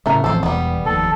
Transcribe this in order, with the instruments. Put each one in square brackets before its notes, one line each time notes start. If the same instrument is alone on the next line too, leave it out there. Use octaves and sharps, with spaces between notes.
[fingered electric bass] A2 C#3 [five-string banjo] A3 A#4
[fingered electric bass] A1 F2 [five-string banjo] A4 C5
[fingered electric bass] E1 [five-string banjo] G3 B3
[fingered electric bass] F1 D#2 [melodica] A4